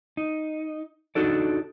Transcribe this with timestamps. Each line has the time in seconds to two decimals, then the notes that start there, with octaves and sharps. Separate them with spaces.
0.17 D#4
1.15 D4 D#4 F#4 A4 D5